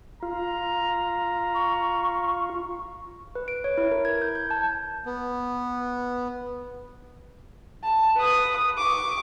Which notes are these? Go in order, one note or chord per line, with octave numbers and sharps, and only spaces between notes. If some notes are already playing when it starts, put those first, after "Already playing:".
F4 A#5
C#6
B4
D7
C#5
E4
A#4
G#6
G6
G6
A5
B3
A5
B4 D#6
C#6 D6